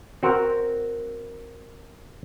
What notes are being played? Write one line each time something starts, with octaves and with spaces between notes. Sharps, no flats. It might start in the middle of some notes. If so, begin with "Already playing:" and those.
C4 F#4 A#4